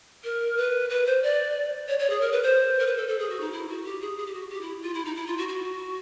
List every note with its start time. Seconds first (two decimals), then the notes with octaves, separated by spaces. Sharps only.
0.24 A#4
0.57 B4
0.90 B4
1.06 C5
1.23 D5
1.88 C#5
1.99 C#5
2.10 G#4
2.21 A#4
2.32 B4
2.43 C5
2.79 A#4
2.86 B4
2.97 A4
3.08 A4
3.19 G#4
3.30 F#4
3.41 D#4
3.52 E4
3.69 F#4
3.85 G4
4.01 G#4
4.17 G#4
4.26 G4
4.34 F#4
4.50 G4
4.61 E4
4.83 F4
4.94 E4
5.05 D#4
5.16 E4
5.27 F4
5.38 F#4
5.48 F#4